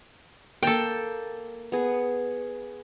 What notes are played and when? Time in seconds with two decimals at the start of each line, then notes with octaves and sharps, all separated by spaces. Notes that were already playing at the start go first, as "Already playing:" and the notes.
0.63 A#3 A4 G5 A5
1.72 B3 G#4